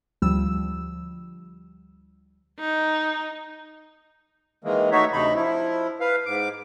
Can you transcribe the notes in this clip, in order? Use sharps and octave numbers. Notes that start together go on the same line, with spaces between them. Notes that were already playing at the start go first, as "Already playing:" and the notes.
D2 F3 G3 E6
D#4
D#3 E3 G#3 A#3
A3 D#4 F#4 C#5 E5
D2 C3 D#4 B5
F3 E4
B4 F5
G#2 D6